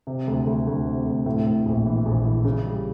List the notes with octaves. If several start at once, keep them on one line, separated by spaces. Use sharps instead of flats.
C3
D2
D2
D2
C3
D2
A2
A2
A#1
E3
A#1
E3
C#3
G3